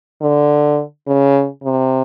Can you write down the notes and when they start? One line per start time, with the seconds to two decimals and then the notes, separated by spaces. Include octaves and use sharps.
0.22 D3
1.07 C#3
1.64 C3